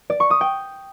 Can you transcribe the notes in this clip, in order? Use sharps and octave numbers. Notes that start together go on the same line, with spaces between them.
D5
C#6
D#6
G5